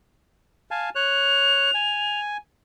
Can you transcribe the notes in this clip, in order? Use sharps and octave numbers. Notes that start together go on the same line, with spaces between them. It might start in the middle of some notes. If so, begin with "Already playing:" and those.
F5 G#5 A5
C#5 F#6 F7
G#5